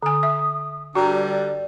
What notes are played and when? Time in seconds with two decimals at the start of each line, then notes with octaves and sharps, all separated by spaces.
0.03 D3 G#5 D#6
0.23 E5
0.95 G2 D3 G3 F#4 A#5
1.15 D5